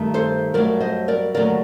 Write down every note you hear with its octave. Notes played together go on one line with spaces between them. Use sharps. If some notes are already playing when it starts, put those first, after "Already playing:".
Already playing: G2 D#3 A3
A4 C5
G2 F#3 A3 A#4 D5
C5 D#5
A#4 D5
D#2 D3 F#3 A3 A#4 D5